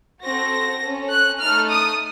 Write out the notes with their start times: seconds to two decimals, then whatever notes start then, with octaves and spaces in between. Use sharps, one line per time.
0.22 C4 F#4 A4 A#6
0.81 C#4 A4
1.10 F#6
1.40 A3 D#4 A4 F6
1.70 D#6